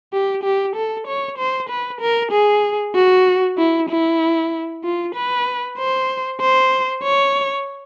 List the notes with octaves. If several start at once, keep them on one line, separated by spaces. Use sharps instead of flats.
G4
G4
A4
C#5
C5
B4
A#4
G#4
F#4
E4
E4
F4
B4
C5
C5
C#5